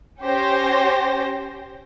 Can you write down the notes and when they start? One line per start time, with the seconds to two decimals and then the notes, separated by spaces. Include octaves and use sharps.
0.23 C#4 G4 C5 A#6